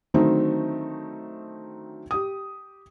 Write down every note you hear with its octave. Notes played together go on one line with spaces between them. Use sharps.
D3 D#3 F#3 A3 C4 D#4
G4 D#6